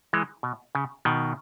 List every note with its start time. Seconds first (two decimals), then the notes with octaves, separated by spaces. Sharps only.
0.13 E3 G#3
0.43 B2
0.75 C#3
1.05 B2 D#3